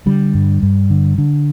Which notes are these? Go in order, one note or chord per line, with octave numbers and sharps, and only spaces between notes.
D3 G3
G2
G2
D3
D3